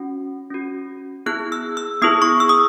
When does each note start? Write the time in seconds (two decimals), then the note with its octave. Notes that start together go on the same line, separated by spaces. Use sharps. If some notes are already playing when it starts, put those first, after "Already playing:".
Already playing: C#4 F#4
0.50 C#4 F#4
1.26 B3 E4 G#4 F#6
1.52 E6
1.77 E6
2.02 B3 E4 G#4 D#6
2.22 C#6
2.40 E6
2.49 D#6